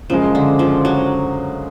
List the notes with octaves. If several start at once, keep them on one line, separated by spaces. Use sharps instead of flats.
F#2 C#3 F3 G#3
D3
F3
F#3